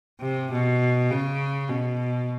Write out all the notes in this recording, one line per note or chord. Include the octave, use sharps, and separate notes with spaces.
C3
B2
C#3
B2